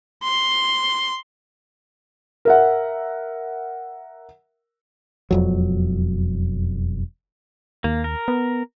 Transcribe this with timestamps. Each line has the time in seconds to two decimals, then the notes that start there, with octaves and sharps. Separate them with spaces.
0.23 C6
2.45 A#4 E5 F#5
5.31 E1 F2 F#3
7.84 D#2 A#3
8.04 A#4
8.28 B3